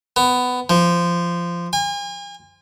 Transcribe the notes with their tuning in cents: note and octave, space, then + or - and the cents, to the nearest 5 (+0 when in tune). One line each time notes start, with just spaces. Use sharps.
B3 +15
F3 -15
G#5 -40